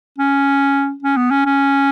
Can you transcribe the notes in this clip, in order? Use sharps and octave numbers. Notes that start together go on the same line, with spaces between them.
C#4
C#4
B3
C#4
C#4